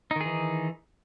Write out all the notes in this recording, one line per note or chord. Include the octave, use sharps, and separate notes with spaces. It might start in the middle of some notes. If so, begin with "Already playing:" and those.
D#3 E3 D#4 G#4